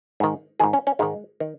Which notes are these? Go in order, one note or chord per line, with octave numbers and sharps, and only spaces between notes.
G#2 D#3
G#2 D#3 G#4
C#4
C#4
G#2 D#3 G#3
D#3